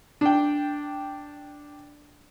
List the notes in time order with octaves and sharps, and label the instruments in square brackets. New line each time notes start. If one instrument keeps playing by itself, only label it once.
[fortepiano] D4 G5